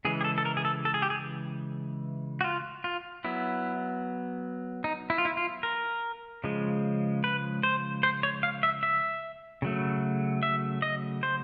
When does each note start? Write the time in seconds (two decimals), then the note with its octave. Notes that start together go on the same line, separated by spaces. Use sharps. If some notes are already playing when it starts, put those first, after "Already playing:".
0.05 C#3 E3 G#3 G#4
0.21 G#4
0.24 A4
0.38 A4
0.45 A#4
0.57 G#4
0.65 A4
0.85 A4
0.94 G#4
1.02 G4
1.10 G#4
2.41 F#4
2.44 F4
2.84 F4
3.25 F#3 B3 E4
4.84 D#4
5.10 E4
5.18 F4
5.25 E4
5.37 F4
5.63 A#4
6.44 C#3 F3 G#3
7.24 B4
7.63 C5
8.03 C5
8.23 C#5
8.43 F5
8.63 E5
8.83 E5
9.62 C#3 F#3 A3
10.43 E5
10.82 D#5
11.23 C5